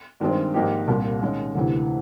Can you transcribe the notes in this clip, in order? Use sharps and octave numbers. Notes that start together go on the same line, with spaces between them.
G2 D#3 G#3 C4
G#2 F3 A#3 D#4 G4
C2 A#2 G3 A#3
D#3 G#3 C#4
D2 C3 E3